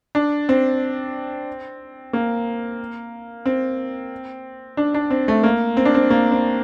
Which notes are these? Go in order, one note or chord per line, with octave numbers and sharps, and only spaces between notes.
D4
C4
A#3
C4
D4
D4
C4
A3
A#3
C4
D4
C4
A#3
C4